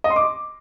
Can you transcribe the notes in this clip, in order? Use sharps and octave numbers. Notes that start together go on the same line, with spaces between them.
D#5
C6
D6